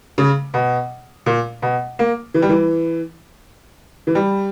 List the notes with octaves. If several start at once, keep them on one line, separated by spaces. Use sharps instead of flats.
C#3
B2
A#2
B2
A#3
E3
G3
E3
E3
G3